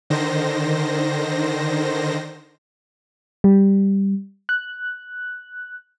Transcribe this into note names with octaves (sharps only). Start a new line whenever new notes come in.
D3 D#3 C5 A#6
G3
F#6